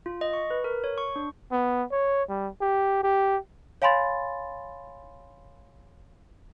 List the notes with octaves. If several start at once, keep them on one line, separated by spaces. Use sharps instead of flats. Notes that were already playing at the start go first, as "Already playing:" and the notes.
F4
D#5
C#6
B4
A#4
C#5
C#6
D4
B3
C#5
G3
G4
G4
C#5 F5 G#5 B5 C6 A6